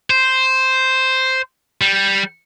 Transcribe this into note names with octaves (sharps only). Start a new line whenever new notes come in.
C5
G3